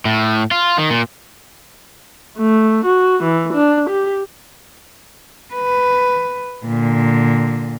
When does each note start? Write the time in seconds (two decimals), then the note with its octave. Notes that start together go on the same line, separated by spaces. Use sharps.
0.05 A2
0.51 F4
0.78 D#3
0.90 A#2
2.38 A3
2.85 F#4
3.23 E3
3.54 D4
3.90 G4
5.54 B4
6.66 A#2 D3